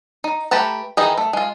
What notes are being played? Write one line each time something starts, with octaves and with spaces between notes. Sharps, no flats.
D#4
A3 G4 B4 A5 A#5
D#3 E3 D#4 G#4 A#5
A3
G#3 F4